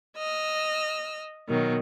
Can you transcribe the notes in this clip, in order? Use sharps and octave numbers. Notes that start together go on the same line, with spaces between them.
D#5 E6 F6
B2 D#3 F#3